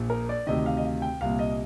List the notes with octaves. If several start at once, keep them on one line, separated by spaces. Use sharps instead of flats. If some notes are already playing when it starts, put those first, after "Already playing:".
Already playing: A#1 A#2
A#4
D5
D2 C3 D#3 D#5
F5
D#5
F5
G5
C2 A#2 F5
D#5